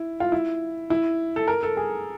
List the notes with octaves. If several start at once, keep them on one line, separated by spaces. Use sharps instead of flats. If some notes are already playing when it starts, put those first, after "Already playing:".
Already playing: E4
F4
E4
E4
A4
A#4
A4
G#4